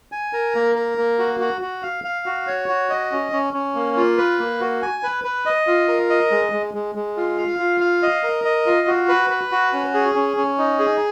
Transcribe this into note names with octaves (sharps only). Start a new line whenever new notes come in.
G#5
A#4
A#3
A#4
A#3
F#4
F#4
F#4
F5
F5
F#4
C#5
F#4
D#5
C#4
C#4
C#4
A#3
F4
B4
A#3
F#4
G#5
B4
B4
D#5
F4
A#4
D#5
G#3
G#3
G#3
G#3
F4
F5
F4
F5
D#5
A#4
D#5
F4
F#4
B4
B4
F#4
C#4
G#4
C#4
C#4
D#4
G#4